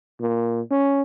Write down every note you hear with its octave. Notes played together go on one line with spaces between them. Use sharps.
A#2
C#4